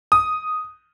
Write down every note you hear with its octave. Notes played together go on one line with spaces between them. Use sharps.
D#6